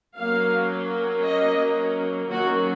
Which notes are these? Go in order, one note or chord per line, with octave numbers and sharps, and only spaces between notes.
F#3 A#3 C#4 F5
D#5
D#3 F#3 A#3 C#4 F#4